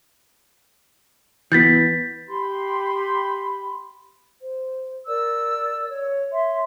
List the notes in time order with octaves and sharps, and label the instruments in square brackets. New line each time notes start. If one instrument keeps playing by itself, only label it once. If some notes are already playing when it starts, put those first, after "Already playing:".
[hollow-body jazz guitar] E3 B3 [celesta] G6 A6 B6
[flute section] G4 B5 C6
C5
A#4 D5 E6
C#5
C#5 E5 C6